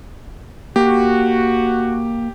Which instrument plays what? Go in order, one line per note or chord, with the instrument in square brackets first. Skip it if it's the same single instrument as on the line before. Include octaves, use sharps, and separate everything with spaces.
[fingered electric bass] A#3 [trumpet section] F#4 [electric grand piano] G4